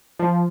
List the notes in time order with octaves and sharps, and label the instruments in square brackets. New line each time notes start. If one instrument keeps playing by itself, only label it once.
[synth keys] F3